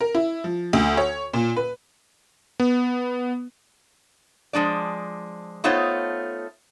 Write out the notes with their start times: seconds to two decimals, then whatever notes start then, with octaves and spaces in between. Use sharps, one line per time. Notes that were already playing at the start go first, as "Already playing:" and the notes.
0.01 A#4
0.15 E4
0.44 F3
0.73 D2
0.97 C#5
1.34 A#2
1.56 B4
2.60 B3
4.53 F3 G#3 D4 D5
5.64 A3 B3 D#4 F4 C5 C#5